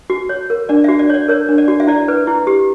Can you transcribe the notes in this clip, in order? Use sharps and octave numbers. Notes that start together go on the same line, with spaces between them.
F#4
C#5
A#4
D4 D5
F#4 E5
D5
C#5 D5
A#4 C#5
D4
D5
F#4
E5
E4 D5
B4
E4
G4